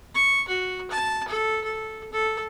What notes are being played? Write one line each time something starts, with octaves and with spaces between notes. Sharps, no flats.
C#6
F#4
A5
A4
A4
A4